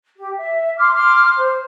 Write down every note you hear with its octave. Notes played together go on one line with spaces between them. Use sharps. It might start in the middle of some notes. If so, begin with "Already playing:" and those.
G4
E5
C6 D6 F6
C6 D6 F6
C5